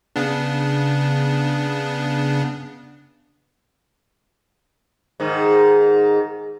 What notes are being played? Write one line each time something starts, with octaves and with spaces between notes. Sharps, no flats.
C#3 B3 D4
G#2 D#3